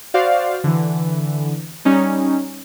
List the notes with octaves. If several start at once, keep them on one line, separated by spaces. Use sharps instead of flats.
F#4 C5 D5 F5
D3 E3
G3 C#4 D#4